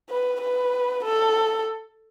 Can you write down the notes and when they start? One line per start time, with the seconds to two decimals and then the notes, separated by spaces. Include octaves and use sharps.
0.10 B4
0.41 B4
1.05 A4